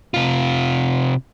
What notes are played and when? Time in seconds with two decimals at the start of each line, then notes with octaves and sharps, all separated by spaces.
0.14 C3 F4